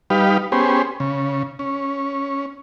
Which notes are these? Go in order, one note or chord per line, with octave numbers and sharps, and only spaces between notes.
G3 D#4 G4 B4 F5
B3 C#4 G4 G#4 C5
C#3
C#4